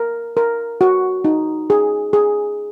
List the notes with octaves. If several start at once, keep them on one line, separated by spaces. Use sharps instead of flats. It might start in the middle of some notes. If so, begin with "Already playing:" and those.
Already playing: A#4
A#4
F#4
D#4
G#4
G#4